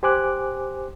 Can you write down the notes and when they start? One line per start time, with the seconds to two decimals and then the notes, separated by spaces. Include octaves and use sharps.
0.03 G4 C5 G#5 D6 F#6